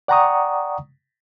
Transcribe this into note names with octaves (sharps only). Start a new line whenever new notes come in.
D5 F#5 G5 A#5 C#6 D#6